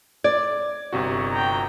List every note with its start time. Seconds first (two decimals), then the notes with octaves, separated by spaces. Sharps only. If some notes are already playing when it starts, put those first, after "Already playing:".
0.24 D5 G#6
0.93 G1 C3 F#4
1.31 G5 A#5